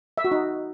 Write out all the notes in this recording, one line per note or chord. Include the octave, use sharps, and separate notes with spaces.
E5
F#4
D#4